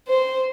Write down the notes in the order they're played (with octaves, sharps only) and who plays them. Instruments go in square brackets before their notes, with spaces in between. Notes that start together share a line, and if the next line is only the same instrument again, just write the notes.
[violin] C5